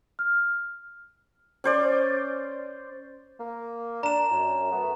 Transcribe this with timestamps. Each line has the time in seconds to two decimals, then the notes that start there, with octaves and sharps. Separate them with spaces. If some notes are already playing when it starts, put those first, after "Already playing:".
0.19 F6
1.64 C#4 C5 D5
3.40 A#3
4.03 D4 A#5 E7
4.31 F#2
4.71 A3 B3